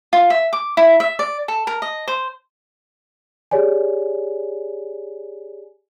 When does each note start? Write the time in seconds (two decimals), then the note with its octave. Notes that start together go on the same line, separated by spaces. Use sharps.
0.13 F4
0.30 E5
0.53 D6
0.77 E4
1.00 E5
1.19 D5
1.48 A4
1.67 A#4
1.82 D#5
2.08 C5
3.51 G4 G#4 C#5 D5 G#5